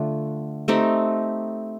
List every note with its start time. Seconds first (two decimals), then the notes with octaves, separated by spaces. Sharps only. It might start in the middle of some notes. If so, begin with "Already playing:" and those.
Already playing: D3 A3 D4 F4
0.68 A3 C4 D#4 G4